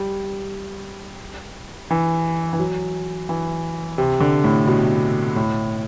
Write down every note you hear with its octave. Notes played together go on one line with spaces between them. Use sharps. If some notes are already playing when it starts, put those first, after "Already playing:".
Already playing: G3
E3
E3
F#3
E3
C3
D3
A2
B2
A2